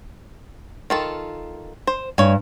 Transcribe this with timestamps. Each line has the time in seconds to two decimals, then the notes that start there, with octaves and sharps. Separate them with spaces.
0.90 D#3 F4 A4
1.87 C5
2.18 G2 C#5 G#5